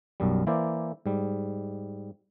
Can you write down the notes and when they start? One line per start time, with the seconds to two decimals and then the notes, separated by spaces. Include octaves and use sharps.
0.20 B1 F#2 G3
0.47 E3 A#3 E4 C5 D5
1.06 G#2 G3